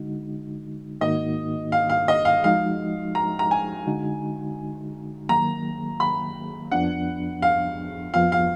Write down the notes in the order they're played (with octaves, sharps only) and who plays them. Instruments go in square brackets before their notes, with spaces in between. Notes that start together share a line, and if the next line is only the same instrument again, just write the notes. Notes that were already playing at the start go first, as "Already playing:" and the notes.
Already playing: [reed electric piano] D3 G#3 D#4 F#4
[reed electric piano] G#2 D#3 A#3 D#4 F#4 [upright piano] D#5
[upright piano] F5
F5
D#5
F5
[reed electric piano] F3 G#3 D#4 F#4 [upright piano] F5
[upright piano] A#5
A#5
G#5
[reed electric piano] D3 G#3 D#4 F#4
[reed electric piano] D#3 F#3 A#3 [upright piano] A#5
[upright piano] B5
[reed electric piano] F2 F3 B3 D4 [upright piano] F#5
[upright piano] F5
[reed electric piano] F2 F3 B3 F4 [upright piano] F5
[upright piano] F5